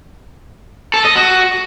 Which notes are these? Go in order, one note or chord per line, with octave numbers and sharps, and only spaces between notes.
A4
D#5
F#4